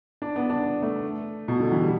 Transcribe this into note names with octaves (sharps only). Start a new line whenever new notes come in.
D4
B3
D4
A3
B2
D3
E3
G3